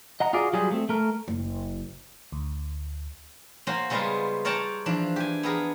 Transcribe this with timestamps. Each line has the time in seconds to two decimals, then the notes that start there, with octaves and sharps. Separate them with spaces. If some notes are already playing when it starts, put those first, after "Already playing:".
0.20 D#5 F#5 A#5
0.33 F4 F#4 G#4 D5
0.53 F#3 G3 F4 G4 G#4
0.72 A3 C4
0.89 A3 A#4
1.28 F#1
2.32 D2
3.67 A#3 C#4 F#4 C5
3.90 C#3 G3 G#3 B3 F4 A#4
4.45 A#4 C#5 D5 G5 A5 A#5
4.86 E3 F3 D4
5.16 G4 G#5
5.43 B3 G#4 A#4